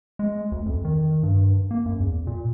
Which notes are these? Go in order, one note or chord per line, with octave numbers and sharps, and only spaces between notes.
G#3
D2
F2
D#3
G2
A#3
F#2
E2
A#2